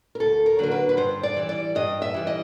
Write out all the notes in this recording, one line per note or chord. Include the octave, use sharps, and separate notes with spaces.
A#4
D2 A4
A#4
D3 F#3 A#3 A#4
B4
B4
G2 C5
D5
E3 G3
D5
G2 D#5
E5
E3 G3
D#5